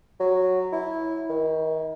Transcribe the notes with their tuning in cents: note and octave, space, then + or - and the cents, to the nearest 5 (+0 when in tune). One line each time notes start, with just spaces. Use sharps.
F#3 -5
E4 -10
D#3 +30